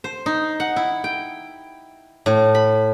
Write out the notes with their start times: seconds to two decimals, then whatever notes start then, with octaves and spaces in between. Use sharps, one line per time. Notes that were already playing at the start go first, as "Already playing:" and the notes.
0.04 C5
0.26 D#4
0.60 F#5
0.76 E4
1.04 G5
2.26 A2
2.55 B5